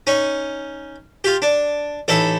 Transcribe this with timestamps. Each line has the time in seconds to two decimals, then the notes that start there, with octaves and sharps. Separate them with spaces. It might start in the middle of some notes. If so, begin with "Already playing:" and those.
0.07 C#4 D#4
1.24 F4 G4
1.42 D4
2.08 A1 D#4 E4 A4